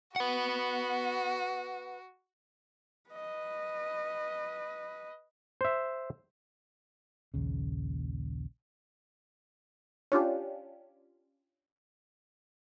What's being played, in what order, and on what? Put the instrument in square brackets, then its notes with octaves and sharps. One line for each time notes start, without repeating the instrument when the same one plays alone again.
[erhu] F#4 [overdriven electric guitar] B4 F#5
[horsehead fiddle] B4 D#5
[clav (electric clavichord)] C5 E5
[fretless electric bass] A#1 D#2 C#3
[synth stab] C#4 D4 F4 G4